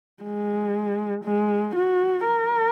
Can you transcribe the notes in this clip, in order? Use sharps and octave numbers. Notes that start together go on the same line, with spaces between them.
G#3
G#3
F#4
A#4